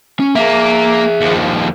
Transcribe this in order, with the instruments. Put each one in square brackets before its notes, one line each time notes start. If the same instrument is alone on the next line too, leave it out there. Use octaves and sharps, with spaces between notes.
[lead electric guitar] C#4
[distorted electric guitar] A#3 [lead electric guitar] G#4 E5
[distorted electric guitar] D#2 F3